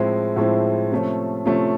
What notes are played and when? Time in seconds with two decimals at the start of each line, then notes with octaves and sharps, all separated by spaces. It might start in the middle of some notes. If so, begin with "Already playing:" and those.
Already playing: A2 F3 G#3 C4 E4
0.36 A2 F3 G#3 C4 E4
0.91 C3 F3 A3 C#4
1.46 C3 F3 A3 C#4